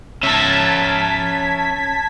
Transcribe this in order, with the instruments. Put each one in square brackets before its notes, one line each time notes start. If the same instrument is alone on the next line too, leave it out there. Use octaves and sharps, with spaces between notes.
[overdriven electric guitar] C#4 E5 [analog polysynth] A5 G#6 B6